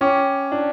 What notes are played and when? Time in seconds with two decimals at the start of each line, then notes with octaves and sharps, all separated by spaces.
0.01 C#4 C#5 G5 D6
0.52 D4